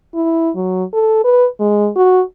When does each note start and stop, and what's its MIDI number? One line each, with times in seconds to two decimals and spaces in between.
0.14 0.50 64
0.55 0.84 54
0.93 1.23 69
1.24 1.47 71
1.60 1.89 56
1.96 2.22 66